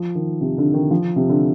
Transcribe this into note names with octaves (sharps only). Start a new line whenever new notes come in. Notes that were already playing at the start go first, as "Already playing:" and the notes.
Already playing: F3
D#3
C3
D3
D#3
F3
C3
D3